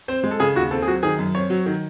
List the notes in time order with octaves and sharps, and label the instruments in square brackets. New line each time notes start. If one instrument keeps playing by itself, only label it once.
[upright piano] C4 [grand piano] C5
[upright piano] G#3
[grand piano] A4
[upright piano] C#3 [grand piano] G#4
[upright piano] D#2 [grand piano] F#4
[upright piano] C4 [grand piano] A4
[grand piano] G#4
[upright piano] F#3 [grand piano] F#4
[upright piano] D#3 [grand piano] G#4
[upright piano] F#2
[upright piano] C4 [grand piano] C#5
[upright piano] F#3
D#3